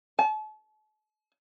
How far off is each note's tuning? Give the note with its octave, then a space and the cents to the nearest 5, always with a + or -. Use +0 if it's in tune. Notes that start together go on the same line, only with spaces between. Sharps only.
A5 -40